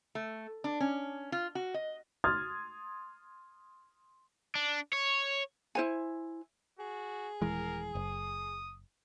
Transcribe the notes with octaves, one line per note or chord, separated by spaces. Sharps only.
A3
D4
C#4
F4
F#4
D#5
C6 D#6 F6 G#6 A6
D4
C#5
E4 C5 G#5
F#4 G#4
D#1 E3 G#3 A#4
F#1 D#6